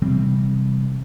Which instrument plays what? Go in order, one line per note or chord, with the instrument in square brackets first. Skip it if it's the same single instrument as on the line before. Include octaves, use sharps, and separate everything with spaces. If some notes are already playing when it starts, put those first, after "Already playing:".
[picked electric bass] C3 E3 G3 C4